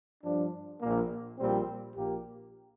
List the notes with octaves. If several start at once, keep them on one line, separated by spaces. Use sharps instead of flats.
G2 F3 D4
A#1 A#2 A#3
A#1 A#2 G3 C4
A#1 A#2 A#3 G4